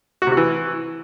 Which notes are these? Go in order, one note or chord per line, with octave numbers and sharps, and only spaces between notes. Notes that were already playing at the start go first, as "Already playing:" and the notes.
F#4
C3
F#4
E3